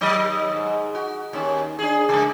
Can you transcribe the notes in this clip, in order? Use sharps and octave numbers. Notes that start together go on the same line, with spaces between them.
D#2 F#3 D#5
G#2
F#4
D#2 C#4
D4 G#4
C#3 G#3